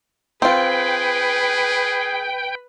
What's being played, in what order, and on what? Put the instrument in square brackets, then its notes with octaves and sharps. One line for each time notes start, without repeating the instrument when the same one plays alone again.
[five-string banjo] C4 F4 [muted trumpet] G#4 [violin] B4 [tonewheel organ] G5